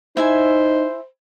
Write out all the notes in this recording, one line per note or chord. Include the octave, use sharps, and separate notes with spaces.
D#4 E4 C5 E5 G#5